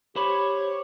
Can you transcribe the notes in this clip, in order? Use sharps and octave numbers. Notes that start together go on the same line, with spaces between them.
G4 C5 C#5 B5